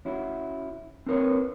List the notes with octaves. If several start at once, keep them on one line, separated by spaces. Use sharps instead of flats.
C#4 E4 F#4
C4 D4 A#4 B4 C#5